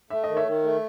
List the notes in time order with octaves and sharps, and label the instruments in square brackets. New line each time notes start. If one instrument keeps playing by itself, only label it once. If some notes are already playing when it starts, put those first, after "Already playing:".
[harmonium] A3 [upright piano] E5
[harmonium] D#3 [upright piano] D#5
[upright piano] C#5 E5
[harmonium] D#3
A3